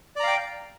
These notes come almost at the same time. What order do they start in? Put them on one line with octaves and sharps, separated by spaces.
D5 A#5 F5 G5